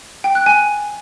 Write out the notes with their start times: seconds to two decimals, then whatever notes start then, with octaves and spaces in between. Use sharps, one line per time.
0.24 G5
0.35 F#6
0.46 G#5